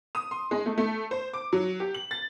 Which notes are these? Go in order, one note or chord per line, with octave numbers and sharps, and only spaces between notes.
D#6
C6
G#3
A3
A3
C5
D6
F#3
G4
F#7
A6